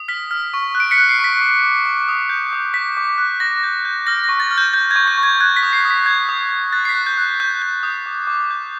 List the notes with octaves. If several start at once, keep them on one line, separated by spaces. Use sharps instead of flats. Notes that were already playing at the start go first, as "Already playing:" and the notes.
Already playing: D#6
F6 B6
F6
C#6
F#6
D7
B6 C#7
F#6
C7
C#6
B6
D6
D6
D6
D#6
G6
D#6
D6 B6
D6
F#6
D6 A#6
G6
G6
F6 A#6
C#6 A#6
A6
F6
G6
F6 G6
G#6
C#6
G6
C#6
G#6
F#6 G#6
B6
D#6
C7
D#6
B6
G6 G#6
D#6
G6
F#6 A6
C7
B6
F#6
G6
F#6
G6
G6
D#6
D6
D6
G6